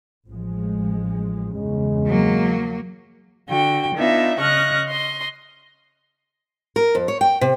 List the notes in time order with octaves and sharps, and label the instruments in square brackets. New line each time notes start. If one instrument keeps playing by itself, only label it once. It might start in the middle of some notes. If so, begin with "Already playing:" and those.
[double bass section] A1 F3 G#3
[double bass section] E2 G2 C#3 [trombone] G#3
[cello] F#3 A#3
[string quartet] D3 F#4 G5
B3 D4 D#4 F4 E5
C#3 D#5 C#6 F6 F#6 A#6
D#5 C6
[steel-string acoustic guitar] A#4
F2
C#5
G5
C3